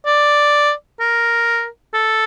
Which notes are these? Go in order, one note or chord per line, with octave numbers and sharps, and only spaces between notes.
D5
A#4
A4